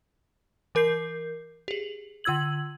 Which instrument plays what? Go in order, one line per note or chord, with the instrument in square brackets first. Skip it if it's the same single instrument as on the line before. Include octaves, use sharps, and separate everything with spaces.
[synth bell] E3 A#4 G6 C7
G4 G#4
D3 F4 E6 G#6 F#7